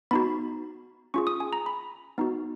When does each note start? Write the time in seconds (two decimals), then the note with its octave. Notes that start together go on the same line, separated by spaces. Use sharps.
0.11 B3 D#4 F#4 B5
1.14 C#4 F4 G#4 C#6
1.27 D#6
1.40 G#5
1.53 A#5
1.66 B5
2.18 B3 D#4 F#4